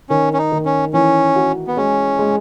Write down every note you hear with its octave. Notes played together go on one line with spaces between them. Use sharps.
D#3 C#4
C#4
D#4
D#3
C#4
E3 C#4
F#4
B3
G#3 C#4
G#3